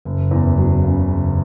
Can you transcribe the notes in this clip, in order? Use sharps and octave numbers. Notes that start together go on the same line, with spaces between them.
F#1
E2
F#3
C#3
F#1